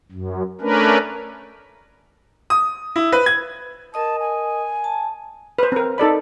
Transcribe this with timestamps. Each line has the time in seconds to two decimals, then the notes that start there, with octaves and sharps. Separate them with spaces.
0.12 F#2
0.61 A3 C#4 D4 A#4 B4
2.50 D#6
2.96 E4
3.12 B4
3.26 G#6
3.94 A#4 D#5 A5 D#6
4.19 G#5
4.84 A5
5.59 B4 C5
5.72 C4 A#4
5.98 D#4 A4 D5 B5